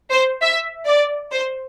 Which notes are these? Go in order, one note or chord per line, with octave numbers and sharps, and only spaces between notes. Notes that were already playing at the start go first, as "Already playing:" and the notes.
C5
E5
D5
C5